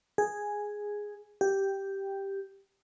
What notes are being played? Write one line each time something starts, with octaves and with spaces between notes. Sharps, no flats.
G#4
G4